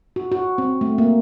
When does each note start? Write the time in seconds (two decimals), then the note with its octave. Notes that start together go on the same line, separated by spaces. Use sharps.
0.16 F#4
0.32 F#4
0.58 C4
0.81 A3
0.98 A#3